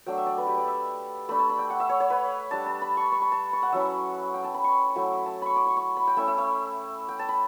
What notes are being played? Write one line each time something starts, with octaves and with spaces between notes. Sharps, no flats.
F#3 A3 D4 G5
E5
D5
B4
G4
D5
E5
A3 D4 B5
A5
B5
G5
F#5
E5
C#5
C#5
B4
G3 D4 A5
A5
B5
C#6
C#6
B5
A5
C#6
F#5
F#3 C#4 E4 E5
G5
A5
B5
C#6
F#3 A3 E4
A5
B5 C#6
D6
C#6
C#6
B5
G5
A3 C#4 E4 E5
E5
E5
G5
A5
B5